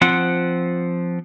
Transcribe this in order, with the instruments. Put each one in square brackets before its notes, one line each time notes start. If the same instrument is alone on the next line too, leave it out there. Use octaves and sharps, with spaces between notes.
[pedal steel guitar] F3 C4 F#5